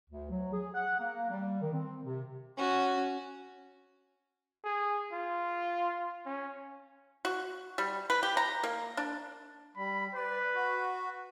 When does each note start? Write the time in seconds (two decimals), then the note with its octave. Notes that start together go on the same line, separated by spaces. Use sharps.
0.09 D2
0.30 F#3
0.53 G#4
0.74 F#5
0.99 A#3
1.30 G3
1.61 D#3
1.72 C4
2.04 C3
2.57 C#4 F#4
4.64 G#4
5.13 F4
6.26 C#4
7.25 F#4
7.78 G3
8.10 B4
8.23 G4
8.37 A#5
8.64 A#3
8.97 D4
9.77 G3 B5
10.15 B4 D5
10.55 F#4